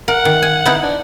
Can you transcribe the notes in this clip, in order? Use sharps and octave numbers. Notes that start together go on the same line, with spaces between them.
A#4 F#5
D#3
G#5
B3 D#4 E4
D4